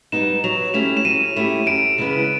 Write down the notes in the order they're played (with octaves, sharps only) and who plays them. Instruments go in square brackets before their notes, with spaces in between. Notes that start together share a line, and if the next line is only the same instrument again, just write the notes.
[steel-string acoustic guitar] G3 B3 D#4 [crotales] E7
[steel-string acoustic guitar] F#3 [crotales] F7
[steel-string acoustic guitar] A3 C#4 E4 G4 [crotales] E7
[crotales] E7
[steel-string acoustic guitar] F#3 [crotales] D#7
[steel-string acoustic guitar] A3 C#4 E4 G4
[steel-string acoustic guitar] F#2 [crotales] D7
[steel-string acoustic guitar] C#3 E3 G#3 B3